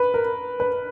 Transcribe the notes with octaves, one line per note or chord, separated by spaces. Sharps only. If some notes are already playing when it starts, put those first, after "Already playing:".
Already playing: B4
A#4
B4